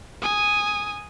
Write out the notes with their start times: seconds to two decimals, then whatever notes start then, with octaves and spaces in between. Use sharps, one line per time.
0.22 G#5 D#6